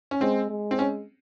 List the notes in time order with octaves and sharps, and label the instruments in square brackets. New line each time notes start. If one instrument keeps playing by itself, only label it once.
[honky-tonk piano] C#4
[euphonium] G#3 [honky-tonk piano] C4
[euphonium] G#3
[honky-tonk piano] C4
C#4